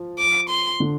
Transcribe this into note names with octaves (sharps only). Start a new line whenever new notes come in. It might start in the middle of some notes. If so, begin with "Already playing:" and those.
Already playing: F3
D6
C6
D3